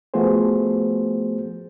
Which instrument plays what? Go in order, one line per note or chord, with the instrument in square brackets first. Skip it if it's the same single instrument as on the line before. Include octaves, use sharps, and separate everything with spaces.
[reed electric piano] F3 A3 B3 F#4 G#4 C5